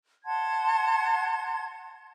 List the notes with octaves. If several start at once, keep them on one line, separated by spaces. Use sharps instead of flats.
F#5 A5 C6 G#6